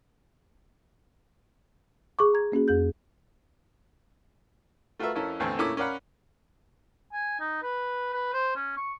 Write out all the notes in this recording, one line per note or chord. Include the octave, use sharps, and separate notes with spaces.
G#4 C#6 D6
A#5 G#6
A#3 C#4 F#4 G#4
F2 G#4 G6
A3 F4 F#4 A#4 B4 E5
F2 C#4 E4 A4 A#4
A1 E2 D3 C4 A4
A#2 A3 C#4 E4 A#4 D6
C#4 A#4 D5 F5 F#5 B5
G#5
D#4
B4
B4
C5
C#4
C#6